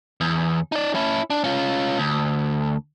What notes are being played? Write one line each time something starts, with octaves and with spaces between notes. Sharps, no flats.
E2
D#4 D5
C#4 E4
D4
C#4 F4
D2